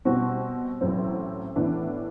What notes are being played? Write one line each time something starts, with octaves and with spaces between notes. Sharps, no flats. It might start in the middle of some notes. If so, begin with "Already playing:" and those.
B2 G3 C4 F#4
A1 A2 F#3 C4
A2 E3 B3 D4